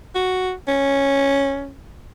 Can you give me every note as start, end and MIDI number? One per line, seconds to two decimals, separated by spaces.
0.15 0.52 66
0.68 1.73 61